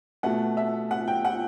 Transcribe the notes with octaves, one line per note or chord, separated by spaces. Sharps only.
B2 A3 F#5
E5
F#5
G5
F#5